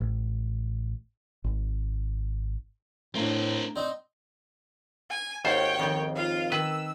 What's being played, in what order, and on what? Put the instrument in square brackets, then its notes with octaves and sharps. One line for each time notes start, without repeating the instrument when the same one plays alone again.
[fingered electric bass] A1
G#1
[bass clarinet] A2 [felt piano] A3 D4 [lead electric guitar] C4 A#4
[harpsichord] C4 D#4 C5 [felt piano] D5
[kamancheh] G#5
[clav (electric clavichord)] G#1 D#2 C5 [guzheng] F4 F#5 [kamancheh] C#5 G5
[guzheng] F2 D#3
[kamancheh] F4 F5
[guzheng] D#3 [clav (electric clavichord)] B4 [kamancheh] E6